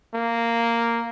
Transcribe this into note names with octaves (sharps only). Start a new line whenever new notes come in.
A#3